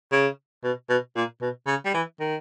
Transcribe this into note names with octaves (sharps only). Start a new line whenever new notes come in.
C#3
B2
B2
A#2
B2
C#3
G3
E3
D#3